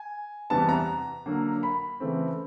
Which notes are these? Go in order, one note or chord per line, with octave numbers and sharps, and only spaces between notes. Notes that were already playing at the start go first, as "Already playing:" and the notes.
Already playing: G#5
E2 C3 E3 G3 B3 A5
A#5
D3 F#3 A#3
B5
C#3 E3 A3 C4